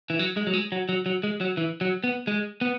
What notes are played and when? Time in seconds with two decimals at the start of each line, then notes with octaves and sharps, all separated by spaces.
0.10 E3
0.19 F#3
0.37 G#3
0.47 F#3
0.53 G#3
0.72 F#3
0.89 F#3
1.06 F#3
1.23 G#3
1.41 F#3
1.57 E3
1.81 F#3
2.04 B3
2.27 G#3
2.61 B3